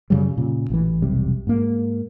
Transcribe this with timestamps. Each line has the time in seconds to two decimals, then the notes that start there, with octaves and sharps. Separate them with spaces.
0.10 F#2 C#3 F#3 G3
0.37 A#2 C#3
0.70 A1 E3
1.02 E1 B1 C3 G3
1.47 G#2 A#3